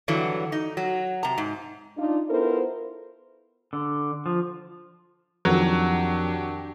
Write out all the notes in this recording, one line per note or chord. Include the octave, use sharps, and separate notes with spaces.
G2 D3 E3 F#3
D#4
F#3
C3 A#5
G#2
D4 D#4 F4
B3 E4 F4 A4 A#4 C5
D3
F3
F2 D#3 F#3 D4 G4